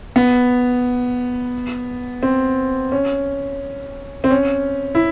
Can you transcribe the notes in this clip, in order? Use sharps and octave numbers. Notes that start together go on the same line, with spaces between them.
B3
C4
C#4
C4
C#4
E4